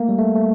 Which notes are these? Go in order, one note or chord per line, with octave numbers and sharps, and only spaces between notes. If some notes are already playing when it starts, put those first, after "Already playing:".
Already playing: A3 A#3
G3
A3
A3